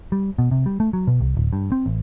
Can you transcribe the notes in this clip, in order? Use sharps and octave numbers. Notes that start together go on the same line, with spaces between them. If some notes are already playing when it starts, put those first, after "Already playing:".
G3
B2
C3
G3
A3
F#3
B2
C2
D1
G2
C4
A1